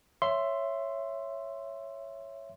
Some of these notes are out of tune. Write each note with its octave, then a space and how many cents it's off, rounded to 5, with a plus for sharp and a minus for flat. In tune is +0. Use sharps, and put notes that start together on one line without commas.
C#5 +0 E5 +15 C6 +0